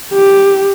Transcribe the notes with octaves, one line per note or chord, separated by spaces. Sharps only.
G4